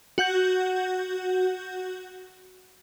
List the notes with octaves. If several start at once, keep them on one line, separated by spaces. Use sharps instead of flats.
F#4 F#5 G6